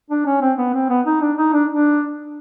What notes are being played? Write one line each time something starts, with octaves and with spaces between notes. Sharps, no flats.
D4
C#4
C4
B3
C4
B3
D#4
D4
D#4
D4
D4